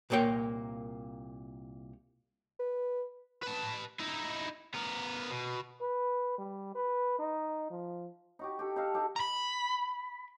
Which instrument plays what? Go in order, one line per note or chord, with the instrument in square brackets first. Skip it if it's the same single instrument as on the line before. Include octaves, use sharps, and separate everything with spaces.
[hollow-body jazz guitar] C2 A#2 A#3 C#5 G5
[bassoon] B4
[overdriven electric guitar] B4 A5
D#4 E4
B3 A#4
B2
[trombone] B4
G3
B4
D#4
F3
[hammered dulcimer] D#4 F#4 G4
G4 A4
D#4 A4 F5
D#4 G4 A4
[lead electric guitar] A#5 B5